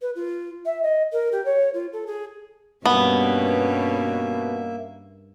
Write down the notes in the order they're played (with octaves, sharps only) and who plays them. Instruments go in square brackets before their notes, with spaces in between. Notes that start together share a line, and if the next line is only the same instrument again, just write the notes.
[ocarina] B4
F4
E5
D#5
A#4
G4
C#5
F4
A4
G#4
[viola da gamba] G2 G3 C#4 [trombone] B2 [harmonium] A#3 E5 [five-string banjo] B3